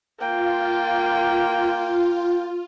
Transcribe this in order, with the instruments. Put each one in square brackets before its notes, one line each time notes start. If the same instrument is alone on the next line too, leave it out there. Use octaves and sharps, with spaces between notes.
[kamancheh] A#3 G5 [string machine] F4